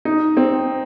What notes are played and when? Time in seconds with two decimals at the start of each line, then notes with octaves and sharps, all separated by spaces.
0.05 D#4
0.37 C4